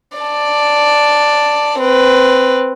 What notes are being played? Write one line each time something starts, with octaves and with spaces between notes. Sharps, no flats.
D5 A5
C4 B4